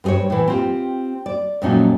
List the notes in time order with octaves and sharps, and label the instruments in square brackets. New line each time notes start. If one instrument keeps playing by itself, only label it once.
[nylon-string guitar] G2 F4 G#4 C5 C#5
A2 E3
C4 F4 G4
D5
F2 A#2 F#3 A3 C#4 D#4